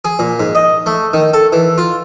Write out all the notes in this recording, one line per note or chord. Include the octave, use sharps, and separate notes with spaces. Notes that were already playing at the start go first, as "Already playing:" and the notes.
G#4
A#2
G#2
D#5
A3
D#3
A4
E3
F4